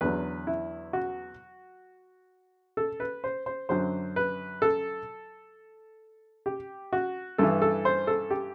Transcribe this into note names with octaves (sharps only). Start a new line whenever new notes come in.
E2 D3 F#3 B4
E4
F#4
A4
B4
C5
C5
F#2 D3 F#3 C5
B4
A4
G4
F#4
G2 E3 A4
A4
C5
A4
G4